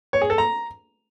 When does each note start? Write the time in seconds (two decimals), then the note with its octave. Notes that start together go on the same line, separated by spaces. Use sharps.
0.13 C#5
0.21 G#4
0.30 A4
0.38 A#5